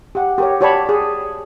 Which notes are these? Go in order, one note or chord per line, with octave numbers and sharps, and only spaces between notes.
G4 F#5
G4 A#4 C#5
F#4 G4 C#5 D5 A5 B5
G#4